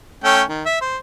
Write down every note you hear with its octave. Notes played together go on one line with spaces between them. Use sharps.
A3 C#4 G5
D#3
E5
C5